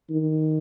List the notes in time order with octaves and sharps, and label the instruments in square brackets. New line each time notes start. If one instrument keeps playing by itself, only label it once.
[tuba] D#3